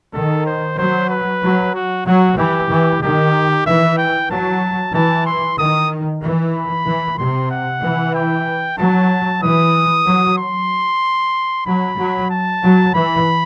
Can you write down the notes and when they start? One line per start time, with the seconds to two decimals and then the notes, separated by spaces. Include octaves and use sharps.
0.13 D#3 A4
0.46 C5
0.78 F#3 C5
1.09 B4
1.42 F#3
1.74 F#4
2.06 F#3 F#4
2.37 E3 G4
2.70 E3
3.02 D#3 G4
3.66 E3 E5
3.97 G5
4.30 F#3 A5
4.93 E3 A5
5.26 C6
5.58 D#3 D#6
6.22 E3
6.54 B5
6.86 E3
7.18 C3 C6
7.50 F#5
7.82 E3
8.14 G5
8.78 F#3 A5
9.42 E3 D#6
10.06 F#3
10.38 C6
11.66 F#3 B5
11.98 F#3
12.30 A5
12.63 F#3
12.94 E3 B5